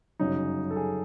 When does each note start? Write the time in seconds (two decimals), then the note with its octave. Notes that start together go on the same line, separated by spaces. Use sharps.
0.19 G1 F#2 C#3 F#3 D#4
0.71 A4
0.76 G#4